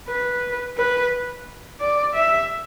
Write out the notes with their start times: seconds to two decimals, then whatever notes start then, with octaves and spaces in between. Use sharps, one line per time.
0.08 B4
0.78 B4
1.80 D5
2.14 E5